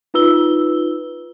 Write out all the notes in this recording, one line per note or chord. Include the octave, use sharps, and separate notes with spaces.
D#4 F4 B4 E6 G7